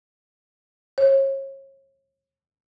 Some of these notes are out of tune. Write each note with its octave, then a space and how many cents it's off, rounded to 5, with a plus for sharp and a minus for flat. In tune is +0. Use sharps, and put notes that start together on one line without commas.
C#5 -35